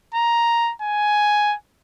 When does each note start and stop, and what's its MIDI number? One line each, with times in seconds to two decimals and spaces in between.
0.15 0.72 82
0.82 1.55 80